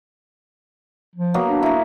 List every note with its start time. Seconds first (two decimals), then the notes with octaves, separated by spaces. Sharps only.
1.16 F3
1.34 F#3 A#3 B3
1.48 D4
1.63 E4 A#5